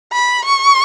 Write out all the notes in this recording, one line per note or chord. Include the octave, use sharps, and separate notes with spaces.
B5
C#6